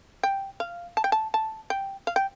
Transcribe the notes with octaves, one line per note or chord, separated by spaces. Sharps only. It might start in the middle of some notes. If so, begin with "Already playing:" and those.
G5
F5
A5
G5
A5
A5
G5
F5
G5